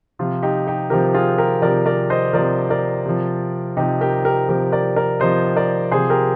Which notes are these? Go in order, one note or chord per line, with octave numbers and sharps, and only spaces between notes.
C3 F3 F4
D#4 G4
D#4 G4
C3 F3 G4 A#4
F4 G#4
G4 A#4
C3 F3 A#4 D5
A#4 D5
C5 D#5
C3 F3 A#4 D5
A#4 D5
C3 F3
C3 F3 D#4 G4
G4 A#4
G4 A#4
C3 F3 G4 A#4
A#4 D5
A#4 D5
C3 F3 C5 D#5
A#4 D5
C3 G#4 C5
F3
G4 A#4